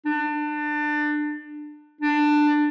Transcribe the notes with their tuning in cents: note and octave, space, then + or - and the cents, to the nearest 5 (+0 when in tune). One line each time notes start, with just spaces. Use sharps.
D4 +25
D4 +15